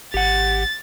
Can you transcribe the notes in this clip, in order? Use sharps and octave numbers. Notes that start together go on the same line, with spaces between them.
G#1 G4 F#5 A6